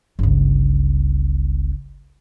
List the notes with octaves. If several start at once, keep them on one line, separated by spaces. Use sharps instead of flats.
G1 C#2